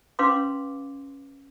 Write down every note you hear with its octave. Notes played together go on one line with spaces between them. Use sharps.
C#4 B4 F5 C6 D6